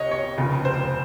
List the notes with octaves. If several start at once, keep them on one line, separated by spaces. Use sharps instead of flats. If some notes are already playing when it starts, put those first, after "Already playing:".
Already playing: C#2 C3 C#5 D#5
C#5
F1 D#2 C#3
C5